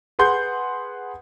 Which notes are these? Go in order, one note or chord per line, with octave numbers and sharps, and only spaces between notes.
G#4 B4 F#5 C6 G6